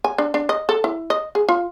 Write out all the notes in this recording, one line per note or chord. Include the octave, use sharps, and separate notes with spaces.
G#5
D4
D4
D#5
A4
E4
D#5
G#4
F4